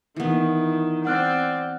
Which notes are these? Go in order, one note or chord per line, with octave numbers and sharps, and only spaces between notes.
D#3 E3 B3
C4 D5 F#5 F6 F#6